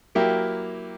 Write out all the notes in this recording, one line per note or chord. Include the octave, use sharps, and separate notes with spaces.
F#3 A#3 E4 G4 A#4